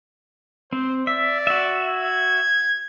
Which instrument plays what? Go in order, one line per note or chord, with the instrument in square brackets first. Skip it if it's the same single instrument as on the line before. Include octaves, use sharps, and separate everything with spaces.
[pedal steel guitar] C4 [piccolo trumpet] C5
[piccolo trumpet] D5 [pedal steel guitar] E5
[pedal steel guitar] F#4 E5
[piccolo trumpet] G#6